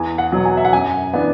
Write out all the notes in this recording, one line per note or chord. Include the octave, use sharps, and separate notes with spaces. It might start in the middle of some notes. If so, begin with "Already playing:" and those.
Already playing: E2 G#5
F#5
B2 F#3
G#5
E5
F#5
F#2 G#5
E3 B3 D4